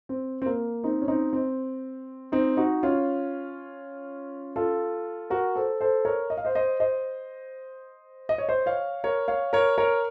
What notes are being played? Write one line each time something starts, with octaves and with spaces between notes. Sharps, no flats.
C4
C4
A#3
C4 D#4
C#4
C4 D#4
C4
C4 D#4
D#4 F#4
C#4 F4
F4 A4
F#4 A#4
A4 C5
A4 C5
A#4 C#5
D#5
F5
C5 D#5
C5 D#5
C5 D#5
D#5
C#5
C5 D#5
C#5 F5
A#4 C#5
C#5 F5
A#4 C#5
A#4 C#5